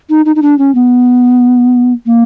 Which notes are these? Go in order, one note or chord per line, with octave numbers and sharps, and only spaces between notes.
D#4
D#4
D#4
D4
C#4
B3
A#3